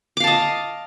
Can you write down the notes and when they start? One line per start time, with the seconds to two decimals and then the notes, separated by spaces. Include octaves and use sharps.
0.17 D6
0.20 F5
0.24 A5
0.27 D#5